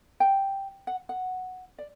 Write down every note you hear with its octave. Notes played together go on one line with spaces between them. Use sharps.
G5
F#5
F#5
D5